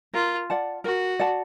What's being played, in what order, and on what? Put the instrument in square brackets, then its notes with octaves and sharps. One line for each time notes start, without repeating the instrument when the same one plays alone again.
[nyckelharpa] F4 [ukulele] A#4
[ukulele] D5 F#5 A5
[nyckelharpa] F#4 [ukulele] A#4
[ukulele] D5 F#5 A5